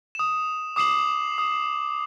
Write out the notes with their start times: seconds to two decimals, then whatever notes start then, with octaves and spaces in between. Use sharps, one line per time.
0.15 D#6 E7
0.76 D6 D#6 C7 E7 F#7
1.38 D#6